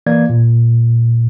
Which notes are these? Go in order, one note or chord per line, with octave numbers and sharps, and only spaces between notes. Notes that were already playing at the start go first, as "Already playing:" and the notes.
E3 A#3 D5 G#6
A#2